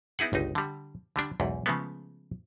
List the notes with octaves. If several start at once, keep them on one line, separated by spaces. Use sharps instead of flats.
B3 D#4 E4 G#4 F#5
G1 C#2 D#4
D3 G3
D3 G3 D4
B1 E2 G#2
C#3 F3 G#3 A3 B3